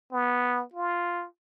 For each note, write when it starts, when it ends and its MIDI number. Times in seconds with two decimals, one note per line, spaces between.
0.12 0.63 59
0.74 1.25 65